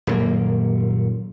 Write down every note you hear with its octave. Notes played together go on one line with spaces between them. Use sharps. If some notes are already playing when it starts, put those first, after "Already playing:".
D#1 F#2 A#3